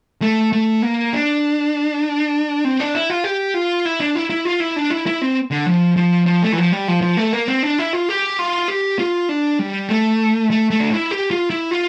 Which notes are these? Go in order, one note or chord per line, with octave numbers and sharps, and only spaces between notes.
A3
A3
A#3
D4
C4
D4
E4
F4
G4
F4
E4
D4
E4
E4
F4
E4
D4
E4
E4
C4
D3
F3
F3
F3
A3
E3
F3
G3
F3
F3
A3
A#3
C4
D4
E4
F4
G4
F4
G4
F4
D4
G3
A3
A3
A3
D4
E4
G4
F4
E4
F4